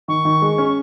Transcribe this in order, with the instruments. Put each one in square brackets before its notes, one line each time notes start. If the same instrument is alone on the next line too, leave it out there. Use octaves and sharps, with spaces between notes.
[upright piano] D#3 [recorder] C#6
[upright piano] D#3
G#3
C#4